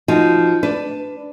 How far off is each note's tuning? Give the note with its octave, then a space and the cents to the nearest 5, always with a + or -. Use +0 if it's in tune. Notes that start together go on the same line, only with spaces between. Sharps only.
F3 -10 D#4 +0 F#4 +0
D4 +0 B4 +20